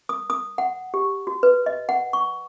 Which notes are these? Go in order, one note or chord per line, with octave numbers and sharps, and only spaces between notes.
D#6
D#6
F#5
G4
F#4
B4
D#5
F#5
C#6